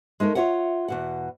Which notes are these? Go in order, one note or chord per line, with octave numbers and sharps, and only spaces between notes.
G#3 A3 D#4 A#4
F4 G4 C#5 E5 F#5
E2 B2 F#5